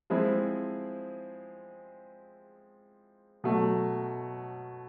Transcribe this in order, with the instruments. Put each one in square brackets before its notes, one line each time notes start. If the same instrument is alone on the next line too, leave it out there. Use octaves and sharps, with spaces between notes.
[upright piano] F3 G#3 C4 E4 G#4
B2 F#3 A3